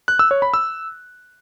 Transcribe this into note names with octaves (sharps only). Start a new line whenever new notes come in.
F#6
E6
C#5
B5
E6